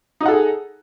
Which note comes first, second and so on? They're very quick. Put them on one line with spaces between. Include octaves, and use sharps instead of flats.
D#4 D#5 F#5 A4 G#4